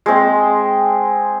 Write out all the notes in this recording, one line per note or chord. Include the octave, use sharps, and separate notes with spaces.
G#3 C4